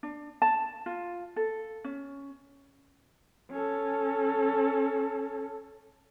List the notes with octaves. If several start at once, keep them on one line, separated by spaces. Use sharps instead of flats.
D4
A5
F4
A4
C#4
C#4 A4